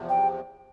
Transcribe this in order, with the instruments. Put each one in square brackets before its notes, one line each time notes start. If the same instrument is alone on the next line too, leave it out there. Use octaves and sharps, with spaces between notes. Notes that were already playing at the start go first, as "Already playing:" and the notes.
Already playing: [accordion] E2 C3 F3
[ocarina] G5